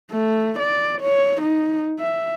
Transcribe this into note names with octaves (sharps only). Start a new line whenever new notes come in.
A3
D5
C#5
D#4
E5